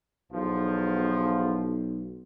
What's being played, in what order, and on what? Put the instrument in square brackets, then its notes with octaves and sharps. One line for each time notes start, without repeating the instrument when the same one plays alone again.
[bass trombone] B1 [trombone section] E2 F3